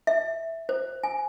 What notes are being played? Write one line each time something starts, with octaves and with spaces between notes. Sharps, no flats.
E5
C5
G#5